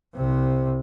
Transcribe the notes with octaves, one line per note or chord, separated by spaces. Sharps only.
C2 C3